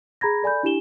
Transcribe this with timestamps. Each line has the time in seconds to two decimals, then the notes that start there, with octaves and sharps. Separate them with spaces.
0.21 G#4 A#5 B5 G#6 A#6
0.43 A4 D5 G#5 B5 G6
0.63 D4 E4 G4 G#5 E7 G7